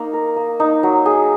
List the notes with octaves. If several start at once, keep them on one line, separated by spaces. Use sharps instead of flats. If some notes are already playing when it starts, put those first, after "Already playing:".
Already playing: A#3 D#4
A#4
A#3
D#4
F#3
G#4